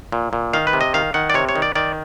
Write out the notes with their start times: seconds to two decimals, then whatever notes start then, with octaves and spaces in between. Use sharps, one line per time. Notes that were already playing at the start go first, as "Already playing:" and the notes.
0.12 A#2
0.33 A#2
0.53 D#3 F5
0.67 B4
0.73 C3
0.81 D#5
0.94 D#3 F5
1.14 D#3 F#5
1.30 D5
1.34 C3 C#5
1.49 C#5
1.56 D#3
1.62 D5
1.75 D#3 D5